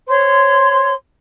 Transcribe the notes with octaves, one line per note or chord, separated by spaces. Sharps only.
C5 C#5 C6